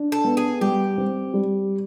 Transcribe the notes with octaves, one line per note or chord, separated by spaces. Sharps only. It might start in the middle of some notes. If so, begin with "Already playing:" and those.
Already playing: D4
A4
B3
G#4
G3 G4
C4
G3